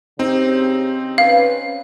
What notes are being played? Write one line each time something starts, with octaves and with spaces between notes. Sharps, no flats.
C#3 C4 D#4 G4 C5
C#4 B4 F5